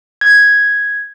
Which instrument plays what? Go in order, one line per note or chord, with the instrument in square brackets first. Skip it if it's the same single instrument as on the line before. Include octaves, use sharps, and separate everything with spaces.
[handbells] G#6